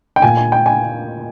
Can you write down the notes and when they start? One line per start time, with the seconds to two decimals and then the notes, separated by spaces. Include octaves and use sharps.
0.16 G5
0.22 A#2 G#5
0.37 G#5
0.52 G5
0.66 G#5